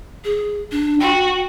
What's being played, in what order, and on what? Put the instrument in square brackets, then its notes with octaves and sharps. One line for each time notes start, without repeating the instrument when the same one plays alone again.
[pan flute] G#4
D4
[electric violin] F#4 [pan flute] G5